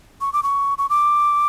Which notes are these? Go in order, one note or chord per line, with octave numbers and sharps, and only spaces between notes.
C#6
D6
C#6
C#6
D6